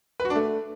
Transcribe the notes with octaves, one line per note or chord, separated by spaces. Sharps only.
B4
F#4
D4
A3